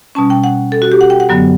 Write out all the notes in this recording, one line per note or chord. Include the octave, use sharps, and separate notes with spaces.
B2 G3 C#4 A5
G5
F#5
A4
F#4
G4
F#5
G5
F#5
F#2 D3 F#3 B3